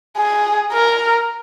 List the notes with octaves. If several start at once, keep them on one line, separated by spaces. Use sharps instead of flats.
G#4
A#4